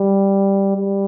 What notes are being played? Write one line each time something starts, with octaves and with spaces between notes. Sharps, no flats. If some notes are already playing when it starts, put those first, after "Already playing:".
Already playing: G3
G3